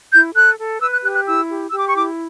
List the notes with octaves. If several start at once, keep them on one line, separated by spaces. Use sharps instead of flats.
E4 G6
A4 F#6
A4
B4 E6
F#6
G4 F#6
F#6
E4 E6
G4
G4 E6
D6
C#6
E4 D6